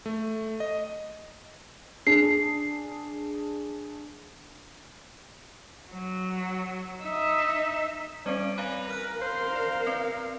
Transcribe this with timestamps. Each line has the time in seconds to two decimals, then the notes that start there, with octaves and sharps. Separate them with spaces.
0.06 A3
0.60 D#5
2.07 D4 G#4 C7
5.90 F#3
7.02 D#4 E5
8.26 G3 C4 C#4 D5
8.58 B4 F5 G#5 A#5 B5
8.90 A#4 F6 F#6
9.21 A#4 C5 F5
9.55 D5
9.87 C4 B4 D5